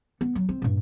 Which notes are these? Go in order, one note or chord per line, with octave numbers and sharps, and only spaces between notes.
B3
F#3
C4
G2 A#2